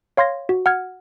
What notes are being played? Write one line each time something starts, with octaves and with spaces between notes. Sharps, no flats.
C#5 F5 C6 G#6 A#6
F#4
F#5 F6 G#6